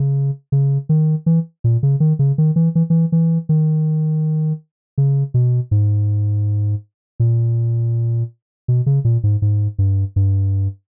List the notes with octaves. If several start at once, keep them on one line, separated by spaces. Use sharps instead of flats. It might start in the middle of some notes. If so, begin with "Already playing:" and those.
Already playing: C#3
C#3
D#3
E3
A#2
C#3
D#3
C#3
D#3
E3
E3
E3
E3
D#3
C#3
B2
G#2
A#2
B2
C#3
A#2
G#2
G#2
G2
G2